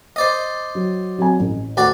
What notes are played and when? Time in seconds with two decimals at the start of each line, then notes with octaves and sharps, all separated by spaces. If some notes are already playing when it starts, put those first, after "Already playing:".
0.16 C5 D5 D#5
0.75 F#3
1.18 F#3 C4 G#5
1.39 A1
1.77 D2 F#4 D5